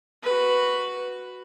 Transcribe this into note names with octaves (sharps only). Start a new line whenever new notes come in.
F#4 B4